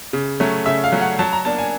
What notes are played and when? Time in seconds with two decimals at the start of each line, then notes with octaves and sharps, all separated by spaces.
0.13 C#3
0.40 F#3 A3 C#4
0.66 C#3 E5
0.84 F5
0.92 F#3 A3 C#4
1.01 F#5
1.19 F#3 A5
1.33 A#5
1.45 A#3 D4 A5
1.58 G#5